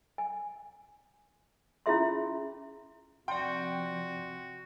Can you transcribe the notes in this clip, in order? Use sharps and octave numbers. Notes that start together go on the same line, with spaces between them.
G#5
C#4 E4 F4 G#4 E5 C6
C3 F3 F#4 D5 G5 C6